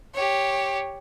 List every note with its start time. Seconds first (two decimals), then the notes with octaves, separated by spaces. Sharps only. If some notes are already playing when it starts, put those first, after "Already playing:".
0.13 G4 C#5